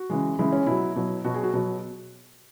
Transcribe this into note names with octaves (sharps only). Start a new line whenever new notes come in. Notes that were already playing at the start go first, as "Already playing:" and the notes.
Already playing: F#4
C#3 E3 G#3
C#3 E3 G#3 E4
C#4
B2 F#3 E4
B2 F#3
B2 F#3 F#4
G#4
F#4
B2 F#3